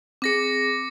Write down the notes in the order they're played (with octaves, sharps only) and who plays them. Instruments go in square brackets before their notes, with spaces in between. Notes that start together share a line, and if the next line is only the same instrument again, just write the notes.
[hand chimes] C4 G#4 [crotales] D6 A#6 C#7